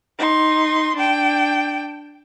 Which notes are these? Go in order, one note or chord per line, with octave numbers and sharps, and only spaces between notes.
D#4 C6
D4 G5